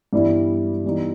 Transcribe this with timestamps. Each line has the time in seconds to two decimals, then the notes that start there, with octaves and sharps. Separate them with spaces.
0.13 G2 E3 G3 B3 E4
0.84 E3 G3 B3 D#4